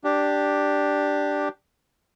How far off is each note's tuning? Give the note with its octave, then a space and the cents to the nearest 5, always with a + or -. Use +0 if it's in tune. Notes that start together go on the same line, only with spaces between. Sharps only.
D4 +0 G4 +0